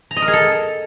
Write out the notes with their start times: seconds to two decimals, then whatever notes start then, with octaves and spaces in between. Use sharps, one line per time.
0.11 A#5
0.16 D#5
0.22 A#4
0.28 G#4
0.33 A4